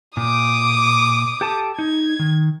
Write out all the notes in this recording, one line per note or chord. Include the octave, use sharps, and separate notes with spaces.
A#2 D6 D#6
G4 A4 A5
D#4 G#6
D#3